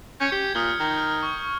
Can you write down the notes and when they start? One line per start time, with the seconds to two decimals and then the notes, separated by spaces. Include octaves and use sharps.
0.20 C#4 G6 G#6 C#7
0.32 G4
0.55 A#2 D#6 F6 G7
0.80 D#3
0.97 F6
1.23 C#6